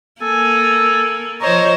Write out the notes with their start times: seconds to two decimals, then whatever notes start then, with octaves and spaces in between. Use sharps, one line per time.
0.22 A#3 A4 G#5
1.41 F3 C5 C#5 D#5 A#5